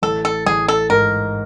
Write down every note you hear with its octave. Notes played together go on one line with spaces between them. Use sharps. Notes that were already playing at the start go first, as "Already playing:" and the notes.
A1 A4
A4
A1 G#4
A4
G#2 A#4